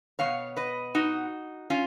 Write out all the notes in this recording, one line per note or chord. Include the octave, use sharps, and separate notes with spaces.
B2 G#3 B3 C#5 F5
B4 D#5
D#4 F#4
C#4 F4